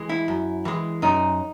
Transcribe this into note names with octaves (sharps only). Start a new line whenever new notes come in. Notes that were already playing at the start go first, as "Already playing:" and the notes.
Already playing: E3 G#3
E4
F#2
E3 G#3
F#2 D#4